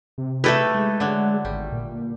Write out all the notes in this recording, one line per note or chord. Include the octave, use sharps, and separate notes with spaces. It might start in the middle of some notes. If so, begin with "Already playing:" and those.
C3
A3 D#4 E4 G4 A4 B4
G#3
D3 F#3
G#1 G3
A#2